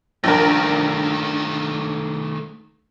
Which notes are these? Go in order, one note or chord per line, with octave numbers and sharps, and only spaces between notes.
A#1 G2 D#3 A3 A#4